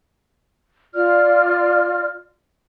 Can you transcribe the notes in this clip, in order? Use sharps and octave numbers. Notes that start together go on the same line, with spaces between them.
F4 D5 F6